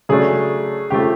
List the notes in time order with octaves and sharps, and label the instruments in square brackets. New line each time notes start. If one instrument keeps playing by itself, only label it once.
[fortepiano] C#3 F#3 A3 D4 [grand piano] G#4
[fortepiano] C#3 F3 A3 [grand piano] G4